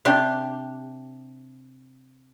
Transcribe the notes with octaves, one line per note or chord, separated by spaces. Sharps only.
C3 D4 G4